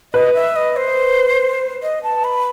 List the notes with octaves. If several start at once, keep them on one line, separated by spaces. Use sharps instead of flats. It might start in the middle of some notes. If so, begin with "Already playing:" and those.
B4 D#5
E5
D#5
C5
D#5
A5
B5